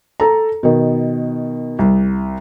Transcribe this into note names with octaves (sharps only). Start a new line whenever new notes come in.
A4 A#5
B2 D#3
C2